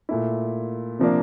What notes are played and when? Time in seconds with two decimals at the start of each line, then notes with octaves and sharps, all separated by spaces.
0.09 A#2 A3 E4
0.99 C3 F3 A#3 D4